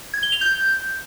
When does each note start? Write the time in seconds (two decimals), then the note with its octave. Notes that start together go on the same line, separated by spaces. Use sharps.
0.14 G#6
0.23 G7
0.32 F7
0.41 G6